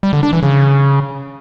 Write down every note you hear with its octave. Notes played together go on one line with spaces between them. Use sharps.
G3
D3
D4
E3
C#3